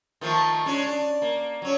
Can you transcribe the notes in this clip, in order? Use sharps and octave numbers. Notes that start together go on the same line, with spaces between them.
D#3 F3 A3
G#3 C#4 D4
D4
A#3
F#3 C#4